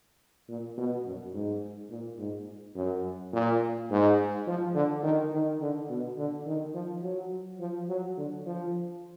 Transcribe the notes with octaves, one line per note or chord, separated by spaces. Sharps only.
A#2
B2
F#2
G#2
A#2
G#2
F#2
A#2
G#2
F3
D3
D#3
D#3
D3
B2
D3
D#3
F3
F#3
F3
F#3
D3
F3